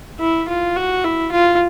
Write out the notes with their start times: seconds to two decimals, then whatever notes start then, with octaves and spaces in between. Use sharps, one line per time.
0.20 E4
0.49 F4
0.76 F#4
1.04 E4
1.32 F4